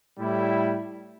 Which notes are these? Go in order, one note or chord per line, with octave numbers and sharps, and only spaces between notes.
A2 G3 E4